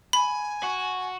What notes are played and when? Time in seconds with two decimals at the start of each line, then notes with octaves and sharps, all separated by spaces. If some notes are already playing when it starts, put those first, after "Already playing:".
0.13 G#5 B5
0.63 F#4